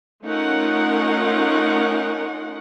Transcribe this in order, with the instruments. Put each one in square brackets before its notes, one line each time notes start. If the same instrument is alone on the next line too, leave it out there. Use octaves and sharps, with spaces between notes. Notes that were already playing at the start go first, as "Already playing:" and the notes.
[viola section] A3 C#4 D#4 F4 A#4 F#5